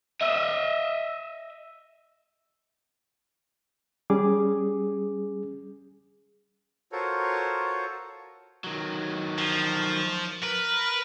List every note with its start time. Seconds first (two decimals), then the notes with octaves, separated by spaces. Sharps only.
0.21 D#5 E5
4.10 G3 C#4 G#4 D6
6.92 F4 F#4 A4 A#4 C5 C#5
8.64 D#3 F#3
9.38 F3
10.43 A#4 B4